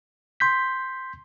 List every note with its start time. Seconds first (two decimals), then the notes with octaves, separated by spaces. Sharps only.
0.40 C6 G6 B6